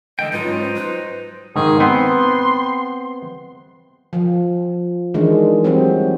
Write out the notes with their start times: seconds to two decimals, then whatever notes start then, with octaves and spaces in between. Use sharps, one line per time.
0.19 D3 E3 G#3 D#5 G5
0.32 G#2 F#3 D#4 F4 B4
0.44 C#4
0.58 C5
0.75 F#3 B4
1.56 G#2 D#3 G#4
1.80 B3 C4 C6
4.13 F3
5.14 D#3 E3 G#3 D4
5.64 F#3 G3 C4